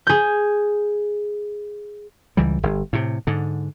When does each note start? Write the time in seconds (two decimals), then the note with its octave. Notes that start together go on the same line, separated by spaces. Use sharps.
0.07 G#4 G6
2.37 C#2 E3 G3
2.63 G1
2.93 A2 C3
3.27 G#2 D3